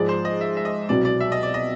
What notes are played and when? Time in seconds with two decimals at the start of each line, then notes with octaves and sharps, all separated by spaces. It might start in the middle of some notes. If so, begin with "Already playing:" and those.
Already playing: G#2 F3 G#3 D5
0.09 C5
0.25 D#5
0.41 E5
0.57 E5
0.65 D#5
0.89 C2 B2 F#3 B3 D5
1.05 D5
1.20 E5
1.32 D#5
1.43 D5
1.54 D#5